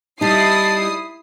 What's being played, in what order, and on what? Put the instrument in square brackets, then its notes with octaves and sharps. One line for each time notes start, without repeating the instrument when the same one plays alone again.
[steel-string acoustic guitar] G3 D#4 [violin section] E4 D#6 C7 [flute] A5